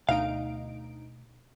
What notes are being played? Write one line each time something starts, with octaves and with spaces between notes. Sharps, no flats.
D2 B2 A3 D#4 F5 D7